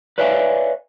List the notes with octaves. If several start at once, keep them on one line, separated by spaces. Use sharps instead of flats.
B4 C#5 D5 E5 F5 G#5